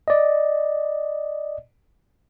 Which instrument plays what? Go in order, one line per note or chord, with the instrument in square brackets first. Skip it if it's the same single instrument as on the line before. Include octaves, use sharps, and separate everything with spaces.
[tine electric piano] D5 D#5